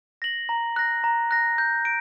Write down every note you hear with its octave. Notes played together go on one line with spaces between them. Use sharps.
A#6 F#7
A#5
F#6 A#6
A#5
F#6 A#6
G6
D7